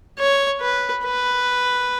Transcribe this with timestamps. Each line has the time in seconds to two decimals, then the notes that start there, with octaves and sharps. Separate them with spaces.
0.19 C#5
0.61 B4
1.05 B4